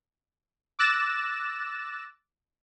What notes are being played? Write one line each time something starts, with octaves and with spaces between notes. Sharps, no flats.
D6 E6 F#6 A6 A#6 E7